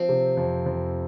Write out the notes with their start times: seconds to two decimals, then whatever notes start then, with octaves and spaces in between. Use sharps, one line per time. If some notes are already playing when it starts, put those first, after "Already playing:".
Already playing: F3 C4
0.09 C3
0.37 F2
0.66 F2